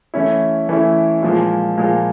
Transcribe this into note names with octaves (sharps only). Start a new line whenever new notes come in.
E3 A3 C#4 E4
E3 A3 C#4 E4
A#2 F3 G#3
A#2 F3 G#3